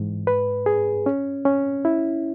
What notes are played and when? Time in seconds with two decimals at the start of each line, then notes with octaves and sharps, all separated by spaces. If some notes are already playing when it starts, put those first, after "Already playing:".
Already playing: G#2 E3
0.27 B4
0.66 G#4
1.06 C#4
1.45 C#4
1.85 E4